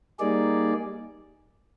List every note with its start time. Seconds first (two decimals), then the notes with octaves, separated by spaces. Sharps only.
0.19 G3 A#3 D#4 G#4 D5